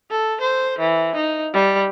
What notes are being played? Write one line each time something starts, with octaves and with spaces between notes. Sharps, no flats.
A4
C5
E3
D#4
G3